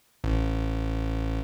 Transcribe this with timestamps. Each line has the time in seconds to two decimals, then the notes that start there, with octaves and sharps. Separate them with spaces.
0.24 A1